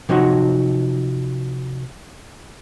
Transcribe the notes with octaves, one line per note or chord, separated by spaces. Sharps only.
C3 F3 F#3 D#4 F#4